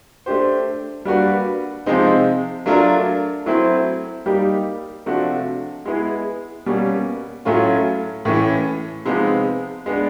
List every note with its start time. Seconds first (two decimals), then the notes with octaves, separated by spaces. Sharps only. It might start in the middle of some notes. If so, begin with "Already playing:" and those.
0.26 A3 D4 G4 C5
1.05 G3 A#3 D4 F#4 B4
1.86 C3 F3 G#3 C4 D#4
2.66 F#3 A3 D4 F4 A#4
3.46 F#3 A3 C4 E4
4.26 G3 A#3 D#4 G4
5.06 C3 F3 A3 D4 F#4
5.85 G#3 B3 E4 G#4
6.66 B2 G3 A#3 C#4
7.45 A2 F#3 A3 C#4 F4
8.25 A2 E3 A3 C#4
9.05 C3 F3 G#3 B3 D#4
9.86 G#3 B3 D4